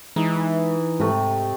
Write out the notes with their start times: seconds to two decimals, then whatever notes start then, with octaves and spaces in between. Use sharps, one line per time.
0.16 E3 G#3 D#4
1.00 G#2 C3 A3